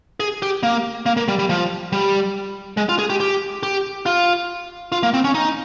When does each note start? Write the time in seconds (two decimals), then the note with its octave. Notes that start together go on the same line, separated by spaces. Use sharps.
0.20 G#4
0.42 G4
0.63 A#3
1.06 A#3
1.17 A#3
1.28 G3
1.39 G3
1.49 F3
1.92 G3
2.77 G#3
2.89 F4
2.99 G#4
3.10 G4
3.20 G4
3.63 G4
4.06 F4
4.92 F4
5.03 A#3
5.14 C4
5.24 C#4
5.34 D#4